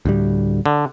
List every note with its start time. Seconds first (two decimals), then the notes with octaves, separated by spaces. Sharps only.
0.05 D2 A2 G3
0.66 D3